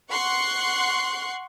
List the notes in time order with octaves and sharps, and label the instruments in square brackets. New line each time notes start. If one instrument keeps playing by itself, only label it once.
[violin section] F#5 C6 C#6 F#6